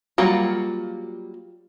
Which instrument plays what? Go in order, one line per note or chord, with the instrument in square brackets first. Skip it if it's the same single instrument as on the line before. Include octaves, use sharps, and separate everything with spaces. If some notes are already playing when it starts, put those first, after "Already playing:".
[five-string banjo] F#3 G3 A#3 F4 F#4